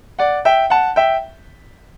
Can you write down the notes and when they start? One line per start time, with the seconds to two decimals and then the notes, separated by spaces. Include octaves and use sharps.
0.19 D5 F#5
0.45 E5 G5
0.70 F#5 A5
0.96 E5 G5